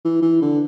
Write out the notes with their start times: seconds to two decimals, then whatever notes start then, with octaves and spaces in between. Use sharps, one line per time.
0.05 E3
0.22 E3
0.42 D3